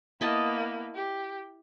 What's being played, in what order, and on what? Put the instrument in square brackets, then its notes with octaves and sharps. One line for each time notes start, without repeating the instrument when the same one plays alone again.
[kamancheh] A#3 B3 [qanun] E4 D#5 A5
[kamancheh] G4